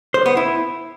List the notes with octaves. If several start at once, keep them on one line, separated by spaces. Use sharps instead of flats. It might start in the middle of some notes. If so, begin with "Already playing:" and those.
C5
B3
E4